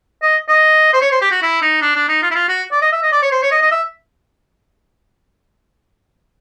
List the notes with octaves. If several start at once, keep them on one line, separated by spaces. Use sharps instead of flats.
D#5
D#5
C5
C#5
C5
G4
F#4
E4
D#4
D4
D4
D#4
F4
E4
F4
F#4
D5
D#5
E5
D#5
D5
C#5
C5
C#5
D#5
D#5
E5